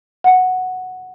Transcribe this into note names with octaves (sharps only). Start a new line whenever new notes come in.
F#5